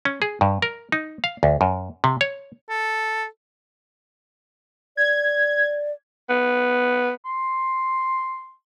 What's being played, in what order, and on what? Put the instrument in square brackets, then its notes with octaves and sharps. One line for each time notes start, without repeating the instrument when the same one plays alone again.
[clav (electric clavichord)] C#4
G#4
G2
A#4
D#4
F5
D2
F#2
C3
C#5
[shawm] A4
[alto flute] D5 [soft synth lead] G#6
[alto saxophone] B3
[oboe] C6